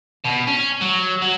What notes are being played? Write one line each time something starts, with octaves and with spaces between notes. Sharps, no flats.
B2
C#4
F#3
F#3